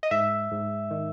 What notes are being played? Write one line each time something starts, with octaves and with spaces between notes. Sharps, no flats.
D#5
G#2 E5
G#2
D#3